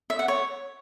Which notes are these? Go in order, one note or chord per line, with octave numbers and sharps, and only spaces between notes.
E5
F#5
C#5